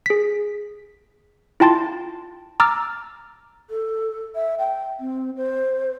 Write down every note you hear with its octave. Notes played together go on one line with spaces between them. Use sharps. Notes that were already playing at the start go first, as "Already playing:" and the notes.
G#4 B6
E4 F4 G5 A5 C6 A6
A#5 D6 E6 F6 A6
A4
E5
G5
C4
C5